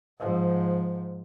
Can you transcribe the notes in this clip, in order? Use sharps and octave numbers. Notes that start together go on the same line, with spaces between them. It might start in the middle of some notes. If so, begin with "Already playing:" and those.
G#2 F3